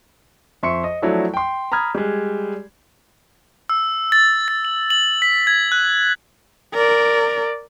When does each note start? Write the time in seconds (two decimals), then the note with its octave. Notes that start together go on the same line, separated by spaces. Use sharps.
0.63 F2 E5 C6 C#6 C#7
0.84 D#5
1.02 F3 F#3 A3 D4 E4 F#4
1.34 G5 C6
1.72 A#5 B5 D#6 F6 G#6
1.95 G3 G#3
3.69 E6
4.12 A6
4.48 A6
4.65 F#7
4.90 F#7
5.22 B6
5.47 G#6
5.72 F#6
6.74 A#4 D5